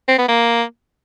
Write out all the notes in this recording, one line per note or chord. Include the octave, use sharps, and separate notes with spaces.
C4
B3
A#3